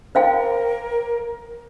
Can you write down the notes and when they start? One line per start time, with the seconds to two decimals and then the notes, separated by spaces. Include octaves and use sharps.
0.15 A#4 C5 F5 G5